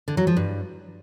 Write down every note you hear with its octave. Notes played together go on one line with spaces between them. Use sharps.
D3
F#3
F3
G2